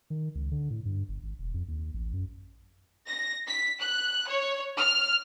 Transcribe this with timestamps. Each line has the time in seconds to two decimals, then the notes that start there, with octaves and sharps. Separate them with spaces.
0.10 D#3
0.35 C#2
0.51 D3
0.70 A2
0.85 G2
1.08 G1
1.23 G#1
1.38 E1
1.54 F2
1.68 D#2
1.94 A1
2.13 F#2
3.08 A#6
3.47 B6
3.81 F#6
4.27 C#5
4.79 F6